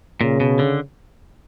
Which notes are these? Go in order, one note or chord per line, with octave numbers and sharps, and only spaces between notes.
A#2 C#3
B2
D3